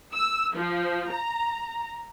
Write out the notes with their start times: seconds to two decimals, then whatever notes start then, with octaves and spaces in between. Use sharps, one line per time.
0.14 E6
0.55 F3
1.11 A#5